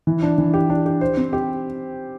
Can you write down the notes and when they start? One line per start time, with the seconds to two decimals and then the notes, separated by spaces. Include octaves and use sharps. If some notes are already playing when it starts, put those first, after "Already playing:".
0.07 E3
0.23 D4
0.38 E3
0.54 G4
0.70 D4
0.86 G4
1.01 C5
1.17 C4
1.33 G4